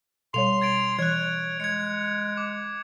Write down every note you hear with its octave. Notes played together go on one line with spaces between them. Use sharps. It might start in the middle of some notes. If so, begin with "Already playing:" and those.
B2 G3 C#5 C6 F7
G#6 A6 D7
E3 C#5 F#6 G#6
G#3 G#6 C#7
D6